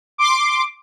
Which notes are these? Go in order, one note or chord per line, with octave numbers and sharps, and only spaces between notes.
C6 D6